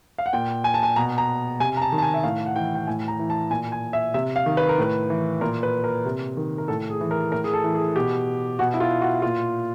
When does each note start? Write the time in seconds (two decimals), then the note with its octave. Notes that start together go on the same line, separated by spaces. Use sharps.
0.18 F5
0.26 F#5
0.33 A#2 G5
0.64 G#5
0.74 A5
0.83 G#5
0.96 B2 A#5
1.18 A#5
1.60 C3 G#5
1.77 A#5
1.82 A5
1.92 D#3
1.98 A5
2.02 G#5
2.14 E5
2.23 A2 F5
2.46 F#5
2.56 E3 G5
2.75 G5
2.87 A2 G#5
3.08 A#5
3.19 E3
3.30 A5
3.51 A#2 G#5
3.72 G#5
3.93 E5
4.14 C3 E5
4.36 F5
4.46 D#3
4.57 B4
4.69 A#4
4.78 A2 B4
5.10 E3
5.41 A#2 A#4
5.63 B4
5.84 A#4
6.05 C3
6.37 D#3
6.58 A#4
6.68 A2 A4
6.90 G#4
7.01 E3
7.11 A#4
7.32 A2 A#4
7.44 G#4
7.54 A4
7.64 E3
7.75 G#4
7.96 B2 G4
8.59 B2 F#4
8.74 E4
8.80 F4
9.02 F#4
9.22 A#2 F4